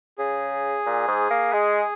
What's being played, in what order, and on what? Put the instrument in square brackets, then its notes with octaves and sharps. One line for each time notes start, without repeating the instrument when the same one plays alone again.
[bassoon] C#3 [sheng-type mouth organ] G#4
[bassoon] A#2
G#2
A#3
G#3